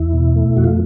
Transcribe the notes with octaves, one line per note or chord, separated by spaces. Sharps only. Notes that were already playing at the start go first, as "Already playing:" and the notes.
Already playing: E2 E4
B2
A3
F2 F#4
F4